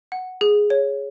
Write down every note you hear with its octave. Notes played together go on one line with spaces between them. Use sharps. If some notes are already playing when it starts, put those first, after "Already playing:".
F#5
G#4
C#5